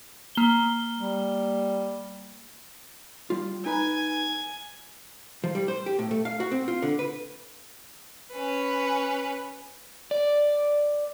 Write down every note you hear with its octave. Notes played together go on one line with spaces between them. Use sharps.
A#3 G7
G3
G3 F4
D#4 B4 G#5 B5
F3
G3
C5
G4
A2
A3
F5
F#4
C4
F4
D3
B4
C#4 B4
D5